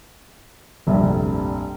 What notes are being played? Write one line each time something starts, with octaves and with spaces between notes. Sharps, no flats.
F1 A#1 G2 C3 E5